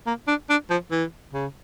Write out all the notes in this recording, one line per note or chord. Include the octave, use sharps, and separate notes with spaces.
A#3
D4
D4
F3
E3
C#3